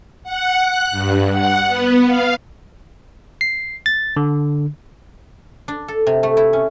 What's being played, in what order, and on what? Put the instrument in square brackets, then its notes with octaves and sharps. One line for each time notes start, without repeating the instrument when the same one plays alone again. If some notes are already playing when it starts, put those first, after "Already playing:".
[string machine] F#5
F#6
G2
F#5
B3
F5
[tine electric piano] C7
A6
D3
[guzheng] D4
A4
C3
A3
E4
C#4